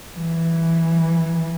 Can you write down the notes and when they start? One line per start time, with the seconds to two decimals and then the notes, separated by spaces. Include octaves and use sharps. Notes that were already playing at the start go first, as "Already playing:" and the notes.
0.17 E3